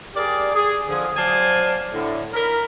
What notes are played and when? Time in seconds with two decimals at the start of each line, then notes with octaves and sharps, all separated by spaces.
0.14 G4 G#4 A#4 D5
0.54 G#4
0.88 D3 F3 G#4
1.16 F#3 C5 D5 F5 G#5 A5
1.92 A2 D3
2.33 A#4 B5